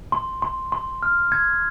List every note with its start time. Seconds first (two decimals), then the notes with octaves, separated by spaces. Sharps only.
0.12 C6
0.42 C6
0.72 C6
1.03 F6
1.32 G#6